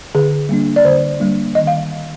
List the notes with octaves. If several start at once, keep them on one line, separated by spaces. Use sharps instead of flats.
D3 G#4
G3 A#3 D4
D5
D3 C5
G3 A#3 D4
D#3 D#5
F5